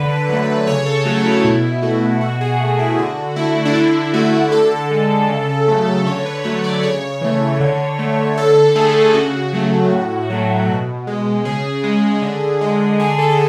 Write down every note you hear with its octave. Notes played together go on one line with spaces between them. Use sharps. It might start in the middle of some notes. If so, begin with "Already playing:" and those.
Already playing: D3 B4
F#3 A3
C#3 C#5
A4
F#3 A3 F#4
E4
B2 E4
A3 F#4
B2 F#4
G#4
A3 F#4
E4
D3 F#4
A3 E4
D4
D3 E4
A3 F#4
D3 A4
G#3
C#3
F#3 A3
D3 C#5
B4
F#3 A3 C#5
D5
C#3 C#5
E3 A3
D3
A3
D3 A4
A3 G#4
C#3 F#4
F#3 A3
A2
F#3 A3
B2
G#3
C#3 G#4
G#3
D3
G#3
D3 G#4
A4